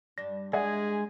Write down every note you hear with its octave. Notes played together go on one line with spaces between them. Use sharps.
G2 D4 A#6
G#3 G#4 D5 E5 F#5 G#5